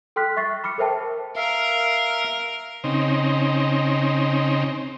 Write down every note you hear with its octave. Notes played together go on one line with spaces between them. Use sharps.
A4 G5 C6 F6 F#6 B6
E5 C#6 A6 C7
B5 D6 F6 C#7
A4 A#4 C5 E5 G5 A5
A#4 E5 F5
C#3 C4 D#4